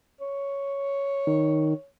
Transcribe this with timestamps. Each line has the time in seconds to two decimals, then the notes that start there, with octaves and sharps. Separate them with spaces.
0.21 C#5
1.27 D#3